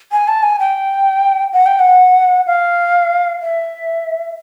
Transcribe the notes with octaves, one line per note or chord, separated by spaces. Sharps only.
G#5
A5
G#5
G5
F#5
G5
F#5
F5
E5